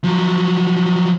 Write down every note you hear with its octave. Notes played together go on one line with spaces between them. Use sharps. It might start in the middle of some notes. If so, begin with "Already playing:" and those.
F3 F#3